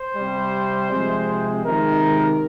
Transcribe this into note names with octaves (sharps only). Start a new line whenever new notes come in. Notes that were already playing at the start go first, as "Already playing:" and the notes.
Already playing: C5
C3 G3
C3 F3 G#3
C3 D#3 G#3 A#4